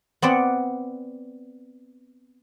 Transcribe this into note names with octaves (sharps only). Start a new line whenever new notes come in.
B3 C4 D5 F#5